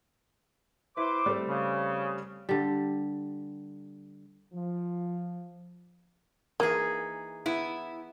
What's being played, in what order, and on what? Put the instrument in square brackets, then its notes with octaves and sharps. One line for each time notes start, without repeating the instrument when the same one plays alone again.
[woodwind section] E4 C5 D6 [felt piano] B4
[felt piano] G3 A3 C4
[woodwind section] C#3
[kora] D3 G3
[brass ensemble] F3
[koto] E3 D#4 G#4 [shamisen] A#3
[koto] B3 [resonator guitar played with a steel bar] E4